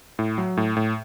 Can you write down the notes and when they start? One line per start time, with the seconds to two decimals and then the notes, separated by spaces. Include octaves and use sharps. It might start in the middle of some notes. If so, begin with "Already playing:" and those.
0.19 A2
0.38 F#3
0.57 A2
0.77 A2